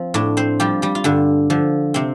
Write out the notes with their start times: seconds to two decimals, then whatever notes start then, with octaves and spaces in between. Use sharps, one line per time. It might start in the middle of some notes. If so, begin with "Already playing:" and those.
Already playing: F3 C4
0.14 A2 D4 D5
0.37 C4 C5
0.60 F3 G3 G4
0.82 G3 G4
0.95 F4
1.04 G2 D3 D4
1.50 D3 F3
1.94 C3 C4